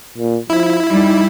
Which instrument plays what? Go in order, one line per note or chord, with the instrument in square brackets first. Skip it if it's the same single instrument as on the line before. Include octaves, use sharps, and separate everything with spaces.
[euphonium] A#2
[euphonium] F3 [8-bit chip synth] E4
[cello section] G3 [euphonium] D#4